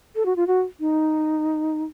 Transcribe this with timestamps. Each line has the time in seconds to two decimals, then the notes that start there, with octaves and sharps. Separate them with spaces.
0.16 A4
0.26 F#4
0.36 F4
0.47 F#4
0.80 D#4